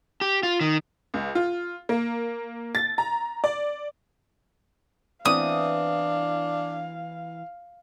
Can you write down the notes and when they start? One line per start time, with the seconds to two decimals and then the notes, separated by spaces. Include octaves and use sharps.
0.21 G4
0.43 F4
0.61 D#3
1.14 C#2
1.35 F4
1.89 A#3
2.75 A6
2.98 A#5
3.44 D5
5.25 E3 B3 C4 D4 F5 D#6